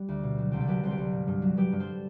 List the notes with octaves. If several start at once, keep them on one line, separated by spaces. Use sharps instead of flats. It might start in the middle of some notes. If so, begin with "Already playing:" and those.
Already playing: G3 B3 G4
D2
B2
F#3
C2 G4
A4
F#3 G4 B4
C2 C5
G4 B4
C2
G2
G2
F#3
F#3 G4 B4
G2
A4 C5